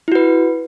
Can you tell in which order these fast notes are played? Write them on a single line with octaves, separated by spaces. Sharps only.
E4 F#4 B4